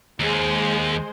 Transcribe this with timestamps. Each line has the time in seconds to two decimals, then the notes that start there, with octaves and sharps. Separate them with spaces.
0.20 D#2 G#3 C5